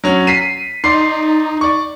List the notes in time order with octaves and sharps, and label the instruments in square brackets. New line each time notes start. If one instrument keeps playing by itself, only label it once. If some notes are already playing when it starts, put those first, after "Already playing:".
[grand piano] F#3 C#4
B6 C7 D#7
[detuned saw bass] D#4 [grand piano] D5 C6 C7
[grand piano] D5 C#6